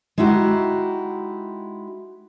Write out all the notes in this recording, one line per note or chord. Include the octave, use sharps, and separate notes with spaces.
G#3 D#4 E4 F#4 G4